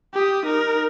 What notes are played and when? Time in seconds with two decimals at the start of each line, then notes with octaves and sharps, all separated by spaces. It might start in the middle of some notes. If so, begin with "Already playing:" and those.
0.14 G4 D#6
0.46 D#4 A#4